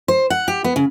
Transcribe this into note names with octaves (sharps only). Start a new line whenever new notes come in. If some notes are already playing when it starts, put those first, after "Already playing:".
C5
F#5
G4
B3
C#3